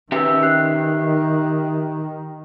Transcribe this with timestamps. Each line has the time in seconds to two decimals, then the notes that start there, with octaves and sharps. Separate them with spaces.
0.12 D#3 C#4 G4 B4 E5 G5 E6
0.43 F#6 C7